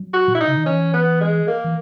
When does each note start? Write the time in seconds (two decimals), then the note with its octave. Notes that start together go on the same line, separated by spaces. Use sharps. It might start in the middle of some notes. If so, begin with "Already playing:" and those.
Already playing: F#3
0.14 F#4
0.28 A#2
0.35 E4
0.38 B2 D#4
0.48 C#3
0.57 D#3
0.66 E3 C#4
0.94 B3
1.21 G#3
1.48 A#3
1.64 E3